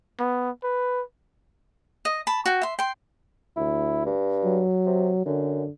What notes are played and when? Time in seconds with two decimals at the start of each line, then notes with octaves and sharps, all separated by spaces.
0.19 B3
0.63 B4
2.05 D#5
2.27 A5 B5
2.46 F#4 G5
2.62 E5 C6
2.79 G5 C6
3.56 D2 E4
4.06 G2
4.44 F#3
4.86 C3
5.26 F#2 D3